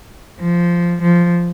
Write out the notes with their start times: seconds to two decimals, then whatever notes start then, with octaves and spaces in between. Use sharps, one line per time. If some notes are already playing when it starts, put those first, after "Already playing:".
0.40 F3
1.02 F3